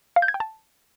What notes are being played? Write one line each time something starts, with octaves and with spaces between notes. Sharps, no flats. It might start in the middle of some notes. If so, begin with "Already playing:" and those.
F5
G6
G#6
G5
A5